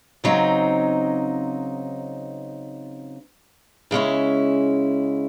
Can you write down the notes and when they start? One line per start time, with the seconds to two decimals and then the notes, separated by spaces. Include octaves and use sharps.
0.24 C#3 F#3 C4 D#4
3.91 C#3 G#3 C#4 E4